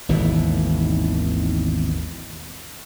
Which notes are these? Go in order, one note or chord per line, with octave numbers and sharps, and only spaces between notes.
G#1 D#2 B2 E3